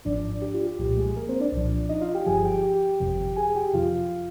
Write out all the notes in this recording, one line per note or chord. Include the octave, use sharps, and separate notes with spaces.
G#1 G#2 F3 D4 D5
G4
F4
G4
C2 A#2 F3 G4
G#3 G#4
G#4
A#3 A#4
C4 C5
D4 D5
C2 A#2 F3
D#4 D#5
F4 F5
G4 G5
G1 G2 F3 G#4 G#5
G4 G5
G4 G5
G1 F2 C3 F3
G#4 G#5
G4 G5
F2 C3 F3 F4 F5